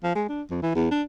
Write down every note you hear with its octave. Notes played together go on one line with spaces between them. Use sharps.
F3
G#3
D4
F2
E3
E2
D4